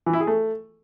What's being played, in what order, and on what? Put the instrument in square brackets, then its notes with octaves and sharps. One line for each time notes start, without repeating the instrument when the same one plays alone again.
[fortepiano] E3
E4
G#4
A3